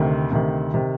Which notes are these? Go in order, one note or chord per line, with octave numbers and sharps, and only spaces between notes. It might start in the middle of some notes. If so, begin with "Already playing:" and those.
Already playing: D2 C3 D#3
D2 C3 D#3
C3 D#3